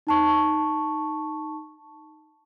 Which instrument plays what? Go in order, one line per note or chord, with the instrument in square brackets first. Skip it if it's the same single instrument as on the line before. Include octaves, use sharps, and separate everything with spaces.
[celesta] D#4 A5 C#6